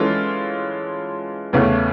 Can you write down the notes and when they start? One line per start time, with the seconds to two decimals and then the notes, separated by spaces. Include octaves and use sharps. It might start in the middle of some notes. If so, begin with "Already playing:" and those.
Already playing: E3 G#3 C#4 F4 A4
1.53 E2 C#3 E3 A3 C#4